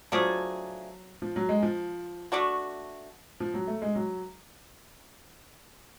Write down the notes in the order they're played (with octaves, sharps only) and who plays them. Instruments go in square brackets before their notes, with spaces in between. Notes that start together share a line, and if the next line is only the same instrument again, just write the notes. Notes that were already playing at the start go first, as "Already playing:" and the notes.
[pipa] F3 A3 D4 G#4 [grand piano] F#3
[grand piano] F3
F#3
G#3
F3
[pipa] A3 D4 F#4
[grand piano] F3
F#3
A3
G#3
F#3